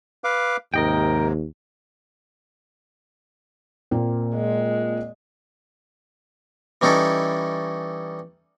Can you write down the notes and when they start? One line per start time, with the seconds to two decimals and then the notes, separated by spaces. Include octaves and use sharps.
0.24 B4 F5 D6
0.74 D#2 G#2 C3 A#4 D#5 G5
3.91 A#2 A#3 C4
4.35 G#3
6.81 E3 G3 C#4 D#4 E4 A4